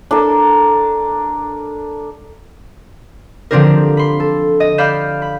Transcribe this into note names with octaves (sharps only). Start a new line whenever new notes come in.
D4 A4 A#4
D3 F3 C4 D4 G4 A#4
B5 C6
A4
D#5
D5 F5 B5 F6 G6 E7
B5